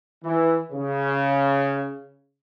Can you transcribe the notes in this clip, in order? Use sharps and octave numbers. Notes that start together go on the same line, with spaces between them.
E3
C#3